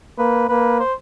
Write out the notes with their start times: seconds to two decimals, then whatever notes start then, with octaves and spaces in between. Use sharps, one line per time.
0.18 A#3 B4
0.49 A#3 B4
0.80 C5